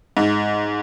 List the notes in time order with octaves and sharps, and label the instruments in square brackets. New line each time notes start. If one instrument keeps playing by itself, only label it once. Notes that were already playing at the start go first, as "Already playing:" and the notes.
[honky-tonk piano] G#2